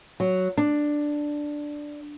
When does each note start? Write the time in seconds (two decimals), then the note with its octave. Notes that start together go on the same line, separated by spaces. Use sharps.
0.20 F#3
0.57 D4